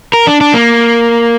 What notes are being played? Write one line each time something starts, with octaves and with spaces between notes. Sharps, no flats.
A#4
D4
D4
A#3